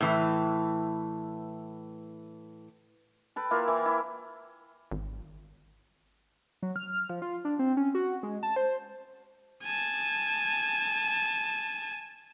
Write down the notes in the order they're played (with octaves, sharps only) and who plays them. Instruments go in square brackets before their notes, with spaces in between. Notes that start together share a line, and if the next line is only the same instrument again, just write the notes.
[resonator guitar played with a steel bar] A2 E3
[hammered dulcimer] A4 B4 G5
A#3 E4 F4
E3
E4
[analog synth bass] G#1
[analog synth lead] F#3
F6
F3
F4
D4
C4
C#4
F#4
G#3
A5
C5
[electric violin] G#5 A5